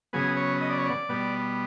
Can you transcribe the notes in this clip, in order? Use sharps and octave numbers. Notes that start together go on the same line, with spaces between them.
C#3 F#3 B3 G#4
C#5
D#5
D5
C#5
D5
B2 G3 B3